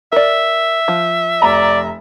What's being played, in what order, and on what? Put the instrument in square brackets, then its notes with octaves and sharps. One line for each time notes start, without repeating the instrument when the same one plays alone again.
[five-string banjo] A#4 D5 [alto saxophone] E5
[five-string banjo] F3
[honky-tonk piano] F1 A#5 [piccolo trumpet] D5